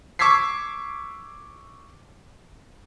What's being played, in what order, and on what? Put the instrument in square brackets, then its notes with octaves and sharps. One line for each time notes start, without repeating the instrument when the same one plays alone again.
[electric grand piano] C#6 D6 E6 G#6 B6 C7